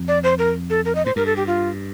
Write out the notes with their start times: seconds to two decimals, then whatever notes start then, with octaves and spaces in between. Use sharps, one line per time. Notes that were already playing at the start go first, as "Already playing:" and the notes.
Already playing: F2
0.08 D5
0.23 C5
0.38 A#4
0.70 A4
0.85 A#4
0.95 D#5
1.06 A2 C5
1.16 G2 A#4
1.26 A4
1.36 G4
1.47 F4